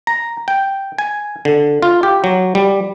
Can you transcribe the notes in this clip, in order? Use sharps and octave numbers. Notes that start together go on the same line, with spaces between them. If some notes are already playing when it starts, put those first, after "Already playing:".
A#5
G5
G#5
D3
F4
G4
F#3
G3